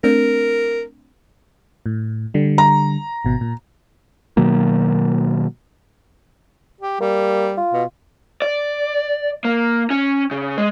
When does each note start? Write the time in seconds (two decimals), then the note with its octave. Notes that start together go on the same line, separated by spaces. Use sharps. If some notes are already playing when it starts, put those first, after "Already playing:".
0.04 A3 C4 D4 A#4
1.86 A2
2.34 D3 G3
2.58 A#5
3.25 G#1 B2
3.41 A#2
4.37 B2 D#3 F#3 A#3
6.81 G4
7.00 G3 A#3
7.57 F4
7.73 B2
8.42 D5
9.45 A#3
9.90 C#4
10.31 C#3
10.58 G#3